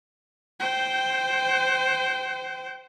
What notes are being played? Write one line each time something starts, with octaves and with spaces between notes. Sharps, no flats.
C5 G5